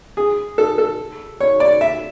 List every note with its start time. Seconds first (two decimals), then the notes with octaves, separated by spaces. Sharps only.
0.17 G#4
0.58 A4
0.78 A4
1.40 C#5
1.60 D5
1.81 E5